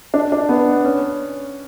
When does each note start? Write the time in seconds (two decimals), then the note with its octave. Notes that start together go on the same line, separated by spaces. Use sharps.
0.14 D4
0.32 D4
0.49 B3
0.85 C#4